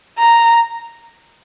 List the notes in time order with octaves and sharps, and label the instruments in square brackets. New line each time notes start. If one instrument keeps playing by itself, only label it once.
[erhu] A#5